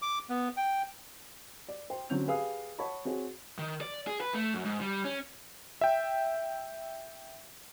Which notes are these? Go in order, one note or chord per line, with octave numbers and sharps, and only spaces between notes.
D6
B3
G5
D5
C5 G5
D3 F#3 C4 C#4 G6 F7
G4 G#4 B4 F5 G#5 D#6
C#5 F#5 A5 B5 C#6
C4 F#4 G#4 C#5
D#3
D5
G#4
B4
A3
F#2
G#2
G3
C#4
E5 G5